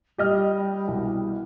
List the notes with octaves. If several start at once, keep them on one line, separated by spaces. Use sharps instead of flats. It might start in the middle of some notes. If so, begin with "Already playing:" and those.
G3 G4 D#5 F6
C2 B2